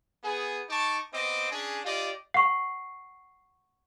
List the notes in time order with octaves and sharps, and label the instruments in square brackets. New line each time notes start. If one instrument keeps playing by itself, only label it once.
[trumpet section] B3 G#4
D#4 A5 C#6 D6
B3 C4 D#5 D6
C#4 D4 G#4
F4 G4 D5 D#5
[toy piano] F#5 C#6 [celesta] C7